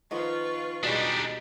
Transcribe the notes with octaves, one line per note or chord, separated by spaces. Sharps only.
D#3 F3 B3 F4 B4 C#6
B2 G3 G#3 D4 D#4 G4 G#4